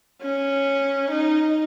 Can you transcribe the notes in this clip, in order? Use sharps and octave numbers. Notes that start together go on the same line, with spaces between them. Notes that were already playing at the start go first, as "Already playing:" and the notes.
C#4
D#4